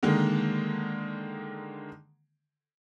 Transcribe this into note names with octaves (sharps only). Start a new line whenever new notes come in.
D3 D#3 G#3 A#3